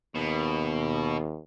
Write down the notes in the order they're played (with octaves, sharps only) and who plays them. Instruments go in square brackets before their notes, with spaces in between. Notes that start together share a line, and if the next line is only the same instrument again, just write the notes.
[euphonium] D#2 [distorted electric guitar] B2